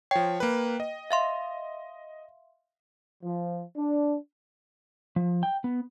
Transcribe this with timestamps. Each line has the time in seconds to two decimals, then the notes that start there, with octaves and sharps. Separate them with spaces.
0.11 F3 C#5 G5
0.40 A#3 B4
0.80 D#5
1.11 E5 F5 C6
3.22 F3
3.76 D4
5.16 F3
5.43 G5
5.64 B3